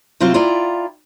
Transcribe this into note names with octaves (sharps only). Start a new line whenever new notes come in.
C3 F#3 C4 E4 F4
E4 F4 D5 G5 A#5